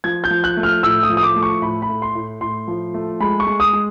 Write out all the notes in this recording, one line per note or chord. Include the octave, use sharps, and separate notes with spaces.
F3 G#6
G6
F3
F#6
A3
F6
A2 E6
D#6
F3
D#6
D6
A3
C#6
A2 B5
B5
A2
C6
A2
A2 C6
F3
A3
G#3 B5
C#6
G#3
D#6
G#3